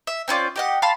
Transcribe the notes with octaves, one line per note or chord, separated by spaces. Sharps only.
E5
C4 C#4 F4 D5
G4 D#5 F#5
F5 A5 B5 C6